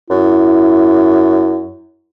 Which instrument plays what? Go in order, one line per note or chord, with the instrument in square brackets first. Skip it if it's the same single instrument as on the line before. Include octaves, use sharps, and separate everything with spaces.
[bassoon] F#2 [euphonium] E4